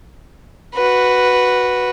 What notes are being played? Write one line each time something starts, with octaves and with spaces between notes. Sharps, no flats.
F#4 B4